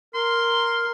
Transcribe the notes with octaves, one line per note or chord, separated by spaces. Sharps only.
A#4 C6